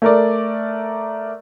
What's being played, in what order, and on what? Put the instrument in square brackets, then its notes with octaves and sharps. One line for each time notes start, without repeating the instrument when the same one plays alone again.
[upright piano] A3 A#4 D5